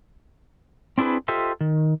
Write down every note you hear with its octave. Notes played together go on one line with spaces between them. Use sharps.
C4 D4 E4 G#4 B4
F4 G4 A4 C5 D#5 E5
D#3